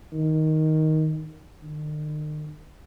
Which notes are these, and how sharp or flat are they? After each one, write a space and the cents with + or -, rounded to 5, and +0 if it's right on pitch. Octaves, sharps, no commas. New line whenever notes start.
D#3 +5
D#3 -45